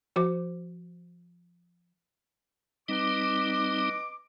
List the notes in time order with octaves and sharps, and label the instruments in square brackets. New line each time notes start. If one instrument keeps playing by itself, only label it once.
[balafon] F3 F#4 C5 D6
[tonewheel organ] G3 C4 D#4 [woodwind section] B4 D#5 D6